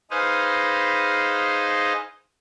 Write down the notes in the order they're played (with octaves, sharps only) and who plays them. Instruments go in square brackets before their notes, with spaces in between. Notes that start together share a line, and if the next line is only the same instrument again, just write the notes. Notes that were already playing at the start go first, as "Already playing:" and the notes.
[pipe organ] D#4 G#4 B4 C5 D#5 F5